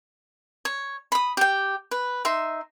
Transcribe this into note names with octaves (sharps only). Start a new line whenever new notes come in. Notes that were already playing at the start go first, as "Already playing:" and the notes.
C#5
B5 D#6
G4 G5
B4
D#4 E5 C6